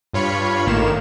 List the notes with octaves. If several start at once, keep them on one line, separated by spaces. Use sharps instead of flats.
G2 F4 C#5 B5 C#7
A1 A2 D#3 A#3 E7